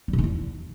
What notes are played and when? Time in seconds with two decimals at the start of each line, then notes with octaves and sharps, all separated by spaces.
0.08 G3
0.13 B2
0.18 D#3
0.24 E2